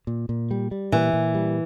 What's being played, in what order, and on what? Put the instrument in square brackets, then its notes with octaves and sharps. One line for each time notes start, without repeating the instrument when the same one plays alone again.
[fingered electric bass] A#2
A#2
G3
G3
[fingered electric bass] A#2 [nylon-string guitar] E3
[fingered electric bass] A#2
G3